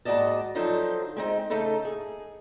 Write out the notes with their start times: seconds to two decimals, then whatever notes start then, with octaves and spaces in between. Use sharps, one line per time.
0.05 D#2 G#2 F#4 D5 D#5 A5
0.55 D3 F3 F#3 D#4 A4 C5
1.16 G#3 C4 D#4
1.50 C#3 A3 D#4 A4 A5
1.85 G#4